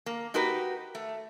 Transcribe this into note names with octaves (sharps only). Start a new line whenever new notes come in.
A#3
D#4 F#4 G4 A#4 B4
A3